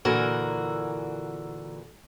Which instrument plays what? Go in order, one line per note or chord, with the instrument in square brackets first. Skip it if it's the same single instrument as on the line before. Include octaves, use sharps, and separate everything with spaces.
[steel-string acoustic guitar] A#2 D3 E3 F#4 A#4